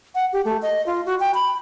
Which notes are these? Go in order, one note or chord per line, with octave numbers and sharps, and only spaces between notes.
F#5
G4
A3
D#5
F4
F#4
G5
B5